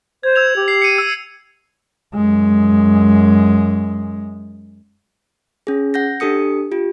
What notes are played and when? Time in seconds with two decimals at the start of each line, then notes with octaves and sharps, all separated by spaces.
0.23 C5 G#6
0.36 E6 G#6 F7
0.56 G4
0.68 C7
0.82 C#7 D#7
0.98 E6 D#7
2.15 F#2 G#3
5.67 C#4 G#4
5.94 F#5 G6 A#6
6.20 D4 G4 A4 D#6 C#7
6.72 F4 G4